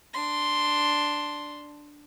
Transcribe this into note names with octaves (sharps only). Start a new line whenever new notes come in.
D4 C6